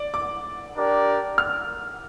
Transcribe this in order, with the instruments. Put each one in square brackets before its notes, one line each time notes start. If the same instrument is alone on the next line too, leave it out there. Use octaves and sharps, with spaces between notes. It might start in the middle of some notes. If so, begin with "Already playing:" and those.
Already playing: [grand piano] D5
D6
[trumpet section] D4 G4 A#4 D5
[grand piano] F6